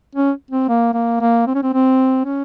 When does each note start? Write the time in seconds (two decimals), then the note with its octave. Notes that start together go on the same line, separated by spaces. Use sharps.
0.15 C#4
0.51 C4
0.69 A#3
0.94 A#3
1.21 A#3
1.46 C4
1.54 C#4
1.63 C4
1.73 C4
2.25 C#4